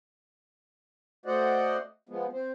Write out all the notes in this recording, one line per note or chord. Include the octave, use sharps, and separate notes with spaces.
A3 F#4 C5 D5 D#5 F#5
F3 G#3 B3
C4 C5